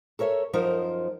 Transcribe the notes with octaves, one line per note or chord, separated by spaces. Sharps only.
A4 A#4 C#5 E5
F#2 F3 D#4 A#4 C5